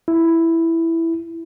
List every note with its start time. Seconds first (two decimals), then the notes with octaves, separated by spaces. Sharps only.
0.08 E4